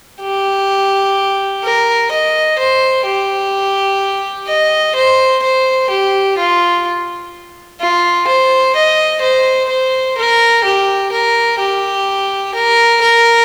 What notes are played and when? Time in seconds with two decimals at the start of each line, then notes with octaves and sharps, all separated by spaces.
0.22 G4
1.63 A#4
2.11 D#5
2.59 C5
3.06 G4
4.48 D#5
4.96 C5
5.43 C5
5.90 G4
6.38 F4
7.80 F4
8.27 C5
8.76 D#5
9.22 C5
9.69 C5
10.18 A#4
10.64 G4
11.12 A#4
11.59 G4
12.55 A#4
13.02 A#4